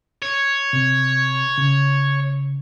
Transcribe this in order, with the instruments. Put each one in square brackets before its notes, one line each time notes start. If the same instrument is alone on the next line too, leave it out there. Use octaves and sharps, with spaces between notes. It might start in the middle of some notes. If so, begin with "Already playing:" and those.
[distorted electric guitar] C#5
[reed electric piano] C3
C#3